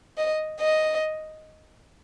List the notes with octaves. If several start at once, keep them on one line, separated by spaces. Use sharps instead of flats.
D#5
D#5